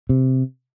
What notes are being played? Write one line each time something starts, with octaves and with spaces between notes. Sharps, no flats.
C3